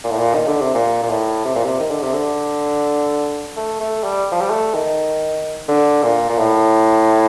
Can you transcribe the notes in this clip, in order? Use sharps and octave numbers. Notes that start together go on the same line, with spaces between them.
A#2
A2
A#2
D#3
D3
C3
A#2
A#2
A2
C3
A#2
C3
D#3
D3
C3
D3
A3
A3
G3
F3
G3
A3
D#3
D3
A#2
A#2
A2